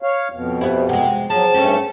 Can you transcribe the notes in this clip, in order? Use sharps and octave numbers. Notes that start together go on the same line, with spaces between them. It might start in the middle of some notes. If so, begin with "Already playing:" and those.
C#5 F5
F2 B2
B3 E4 G4 C5 F5
C3 G#3 F#5 G5
F3 F#3 G#4 A5
G2 A3 C4 C#4 G4